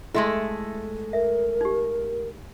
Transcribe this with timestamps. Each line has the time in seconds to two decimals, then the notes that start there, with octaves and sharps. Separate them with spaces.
0.14 G#3 A3 E4 A4 E5 C6
1.13 A#4 E5
1.61 D#4 G4